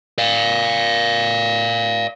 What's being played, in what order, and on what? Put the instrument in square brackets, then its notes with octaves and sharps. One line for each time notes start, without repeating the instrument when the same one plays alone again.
[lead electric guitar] D5 F5